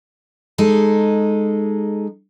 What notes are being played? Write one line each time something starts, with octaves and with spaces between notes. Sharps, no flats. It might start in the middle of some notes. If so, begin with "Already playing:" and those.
G#3 D#4 A4